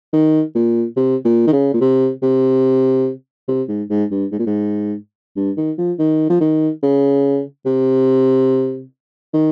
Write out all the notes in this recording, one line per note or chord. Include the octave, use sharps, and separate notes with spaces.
D#3
A#2
C3
A#2
D#3
C#3
A#2
C3
C3
C3
G#2
G#2
G2
G#2
A#2
G#2
G2
D#3
F3
D#3
F3
D#3
C#3
C3
D#3